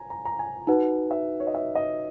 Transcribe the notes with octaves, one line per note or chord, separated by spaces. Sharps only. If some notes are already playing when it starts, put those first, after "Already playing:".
Already playing: G#5 A#5
A#5
A#5
G#5
D#4 F#4 B4 F#5
E5
C#5
D#5
E5
D#5